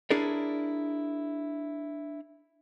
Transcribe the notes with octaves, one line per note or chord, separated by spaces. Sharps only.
D4 E4 G#4 A#4 C#5 D5